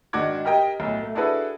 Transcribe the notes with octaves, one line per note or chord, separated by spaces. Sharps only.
G#2 D#3 D4 F#4 D6 G#6
G4 A#4 D#5 G5
B1 A2
A3
D4 E4 F#4 G#4 A4 B4